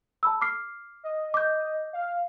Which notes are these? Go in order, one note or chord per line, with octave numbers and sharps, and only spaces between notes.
A5 B5 E6
D6 F6 C7
D#5
D6 G6
F5